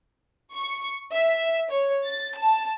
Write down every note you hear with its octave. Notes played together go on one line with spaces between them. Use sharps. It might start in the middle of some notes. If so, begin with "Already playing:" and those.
C#6
E5
C#5
A6
A5